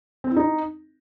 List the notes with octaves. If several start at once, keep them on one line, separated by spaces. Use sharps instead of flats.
C4
E4
D#4